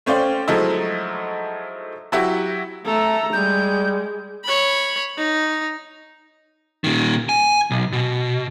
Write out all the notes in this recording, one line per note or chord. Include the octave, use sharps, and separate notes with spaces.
A3 C#4 C5 D5 F5 G5
F3 F#3 G#3 A3 D#4 E4
F#3 E4 F#4 G4
A3 A4 A#5
G3 G#3 G6
C#5 B5
D#4
A#2 D#3
G#5
B1
B2